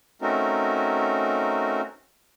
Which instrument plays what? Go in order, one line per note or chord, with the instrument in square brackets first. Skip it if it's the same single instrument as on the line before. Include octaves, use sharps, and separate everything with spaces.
[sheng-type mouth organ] A3 C4 C#4 D#4 F#4 A#4